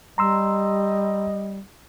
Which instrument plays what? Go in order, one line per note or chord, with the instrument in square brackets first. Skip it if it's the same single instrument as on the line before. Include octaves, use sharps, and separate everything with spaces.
[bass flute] G3 [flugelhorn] D#5 [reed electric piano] A#5 C6 E6